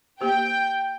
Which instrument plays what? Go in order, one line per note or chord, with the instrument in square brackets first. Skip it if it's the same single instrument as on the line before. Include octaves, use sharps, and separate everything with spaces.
[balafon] A#3 G4 C5 [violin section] G5